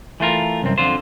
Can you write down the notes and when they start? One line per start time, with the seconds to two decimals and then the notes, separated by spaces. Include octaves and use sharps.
0.20 E3 A3 F4 A#4
0.62 C2 F#2 C4
0.78 F2 D3 F4 C5